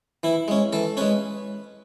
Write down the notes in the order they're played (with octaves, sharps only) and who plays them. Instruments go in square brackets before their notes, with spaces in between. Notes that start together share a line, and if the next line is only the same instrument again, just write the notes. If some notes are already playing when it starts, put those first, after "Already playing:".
[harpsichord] E3 E4
G#3 C#4
E3 A4
G#3 C#4 B4